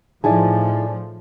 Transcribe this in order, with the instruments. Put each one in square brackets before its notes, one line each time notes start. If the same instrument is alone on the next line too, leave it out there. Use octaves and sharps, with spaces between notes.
[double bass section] A2 F3 [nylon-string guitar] D#4 E4 G#4 [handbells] D5 G#5 A5